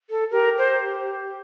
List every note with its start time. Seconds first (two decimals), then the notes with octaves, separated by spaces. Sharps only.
0.10 A4
0.31 G4 A#4
0.58 C5